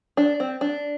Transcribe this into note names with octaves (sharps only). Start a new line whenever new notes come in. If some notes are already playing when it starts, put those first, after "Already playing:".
D4
C4
D4